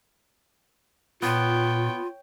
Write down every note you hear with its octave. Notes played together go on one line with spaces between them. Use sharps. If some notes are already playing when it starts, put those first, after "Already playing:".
A#2 B3 F4 C#5 G5